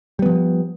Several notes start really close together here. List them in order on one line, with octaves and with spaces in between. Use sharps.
G3 B3 F3